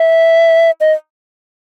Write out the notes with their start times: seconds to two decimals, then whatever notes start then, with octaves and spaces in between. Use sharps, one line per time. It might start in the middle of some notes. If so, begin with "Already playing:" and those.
Already playing: E5
0.81 D#5